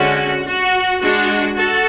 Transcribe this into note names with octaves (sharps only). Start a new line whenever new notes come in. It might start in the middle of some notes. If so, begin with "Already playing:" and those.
Already playing: D3 G#3 C#4 F#4
F#4
G#3 D4 F#4
F#4 A4